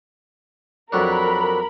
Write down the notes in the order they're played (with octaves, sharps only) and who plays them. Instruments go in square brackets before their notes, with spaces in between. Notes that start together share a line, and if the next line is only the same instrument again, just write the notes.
[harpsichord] F2 F#3 D4 [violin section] A#4 B5